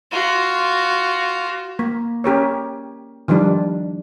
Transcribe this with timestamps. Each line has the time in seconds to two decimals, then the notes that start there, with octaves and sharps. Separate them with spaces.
0.12 F4 F#4
1.79 A#3
2.24 C#4 G4 A#4 C#5
3.28 D#3 F3 G3 D4